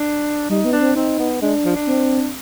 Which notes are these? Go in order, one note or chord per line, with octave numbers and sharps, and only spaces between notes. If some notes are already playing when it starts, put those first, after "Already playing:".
Already playing: D4
G3 D#4
B3
D4
C4
C4 D#4
B3
G#3 D4
F3
D4
C4